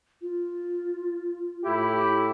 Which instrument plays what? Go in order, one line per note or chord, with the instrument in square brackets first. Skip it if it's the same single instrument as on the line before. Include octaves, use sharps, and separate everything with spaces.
[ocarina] F4
[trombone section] A2 E4 G4